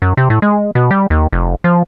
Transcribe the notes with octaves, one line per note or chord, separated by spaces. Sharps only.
F#2
C3
A2
G#3
B2
G3
D#2
F1
F3